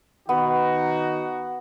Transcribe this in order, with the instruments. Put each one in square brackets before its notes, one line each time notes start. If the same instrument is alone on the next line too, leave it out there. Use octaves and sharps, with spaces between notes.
[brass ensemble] D#3 D#4 F#4 [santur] B3